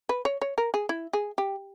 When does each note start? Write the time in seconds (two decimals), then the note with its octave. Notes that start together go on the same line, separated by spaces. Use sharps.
0.09 B4
0.25 C#5
0.42 C#5
0.58 A#4
0.74 G#4
0.89 E4
1.13 G#4
1.38 G4